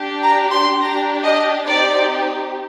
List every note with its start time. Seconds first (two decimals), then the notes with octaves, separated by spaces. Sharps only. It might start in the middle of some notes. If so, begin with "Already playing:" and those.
Already playing: D4 G4
0.22 A#5
0.51 C6
0.80 D4 G4 A#5
1.23 D#5
1.67 C4 D#4 G4 D5